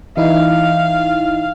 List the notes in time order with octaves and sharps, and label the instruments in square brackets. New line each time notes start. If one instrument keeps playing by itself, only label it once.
[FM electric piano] E3 D#4 E4 [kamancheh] F5